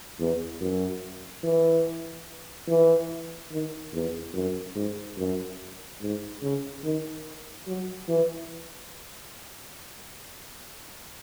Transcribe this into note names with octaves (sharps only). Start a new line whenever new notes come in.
E2
F#2
E3
E3
D#3
E2
F#2
G#2
F#2
G#2
C#3
D#3
F#3
E3